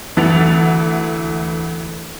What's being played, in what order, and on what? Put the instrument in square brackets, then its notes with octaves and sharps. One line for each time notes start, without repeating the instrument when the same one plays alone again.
[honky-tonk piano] D2 E3 E4 F#5 A6 F7